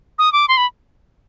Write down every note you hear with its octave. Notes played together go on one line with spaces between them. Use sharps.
D#6
D6
C6
B5